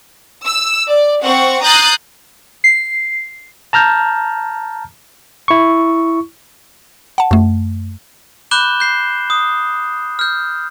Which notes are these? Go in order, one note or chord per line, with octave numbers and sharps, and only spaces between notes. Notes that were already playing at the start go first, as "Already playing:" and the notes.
E6
D5
C4 F#5 C#6
A#5 D#6 F#6 G6 A6 C7
C7
A5 A#5 F6 G6
E4 C#6
F#5 A5
F#2 A3
B5 D6 F#6 G6 E7 G7
G6 C7
D#6
F6 G6